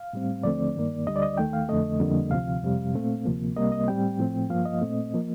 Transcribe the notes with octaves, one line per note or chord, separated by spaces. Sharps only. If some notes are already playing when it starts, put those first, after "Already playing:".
Already playing: F5
A2 G3 C4
D#2 D3 F3 A3 C4 D5
G2 D#3 A#3
D2 D3 G3 D#5
D5
D#5
D#2 D#3 A3 G5
F5
F2 D3 A3 D#5
F2 D3 G3 A#3
D2 C3 F3 F5
F2 C3 G3
A#2 A3 C4
D2 C3 F3 A#3
C2 C3 G3 A#3 D#5
D#5
A2 G3 C4 G5
A2 F3 A3 C4
G2 F3 A#3 F5
D#5
A#2 A3 C4
F3 A#3